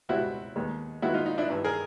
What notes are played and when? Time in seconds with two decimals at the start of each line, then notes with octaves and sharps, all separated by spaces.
0.09 C#2 B2 G3 C4 E4 F#4
0.56 D#2 D#3 G#3 B3
1.02 D#2 D#3 G#3 B3 E4 F#4
1.14 D#4 F4
1.26 D#4
1.38 D4 E4
1.49 G#1 G2 E3
1.64 G#4 A#4